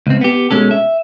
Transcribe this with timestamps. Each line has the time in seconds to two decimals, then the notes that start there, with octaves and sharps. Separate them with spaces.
0.07 C#2 C4
0.21 B3 G4
0.51 B2 G#3 C#4 A4
0.71 E5